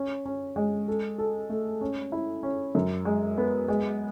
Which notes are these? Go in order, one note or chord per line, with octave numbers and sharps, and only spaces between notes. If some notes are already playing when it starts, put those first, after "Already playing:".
Already playing: C#4
C#4
G#3
A4
A4
A3
C#4
E4
C#4
F#2
G#3
B3
G#3